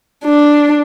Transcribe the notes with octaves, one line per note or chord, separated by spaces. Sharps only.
D4